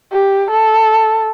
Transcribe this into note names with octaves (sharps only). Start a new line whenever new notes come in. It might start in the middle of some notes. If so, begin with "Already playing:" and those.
G4
A4